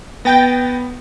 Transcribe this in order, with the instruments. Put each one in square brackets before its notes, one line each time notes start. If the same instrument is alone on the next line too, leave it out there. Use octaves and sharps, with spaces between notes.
[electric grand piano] B3 [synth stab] G5 A6 A#6